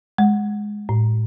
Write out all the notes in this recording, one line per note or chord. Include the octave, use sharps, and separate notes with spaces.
G#3
A2